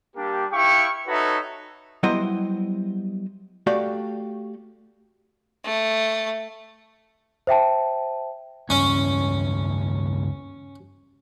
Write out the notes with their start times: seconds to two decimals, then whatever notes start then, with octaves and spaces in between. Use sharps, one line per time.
0.16 G3 A#3 D4 G4
0.52 E4 G4 F5 G5 C#6
1.08 D#4 F#4 A4 B4 C#5 E5
2.03 F#3 G3 B3 E4 C5 D#5
3.67 A3 F#4 G4 D5 F5
5.64 A3
7.47 C5 E5 G5 A5
8.70 C#2 G2 C#4